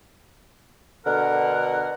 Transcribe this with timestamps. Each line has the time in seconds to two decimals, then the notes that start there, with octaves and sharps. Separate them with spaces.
1.05 B2 D3 A#4 F#5